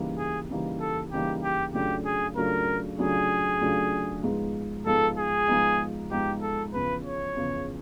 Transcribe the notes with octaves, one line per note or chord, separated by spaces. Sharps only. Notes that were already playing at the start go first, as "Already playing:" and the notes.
Already playing: C#3 E3 G3 A#3 D#4
G#4
C#3 E3 G3 A#3 D#4
A4
C#3 E3 G3 A#3 D#4 G4
G4
C#3 F#3 A3 D4 F4 G4
G#4
C#3 F#3 A3 D4 F4 A#4
C#3 F#3 A3 D4 F4 G#4
C#3 F#3 A3 D4 F4
G#2 F3 G#3 B3 D#4
G#2 F3 G#3 B3 D#4 A4
G#4
G#2 F3 G#3 B3 D#4
G#2 F3 G#3 B3 D#4 G4
A4
E2 C#3 F3 B4
C#5
E2 C#3 F3